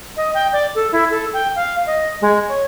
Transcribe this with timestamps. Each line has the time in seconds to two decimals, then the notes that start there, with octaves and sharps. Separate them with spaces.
0.17 D#5
0.34 G5
0.52 D5
0.75 A4
0.92 E4
1.11 A4
1.34 G5
1.56 F5
1.86 D#5
2.21 G#3
2.48 C#5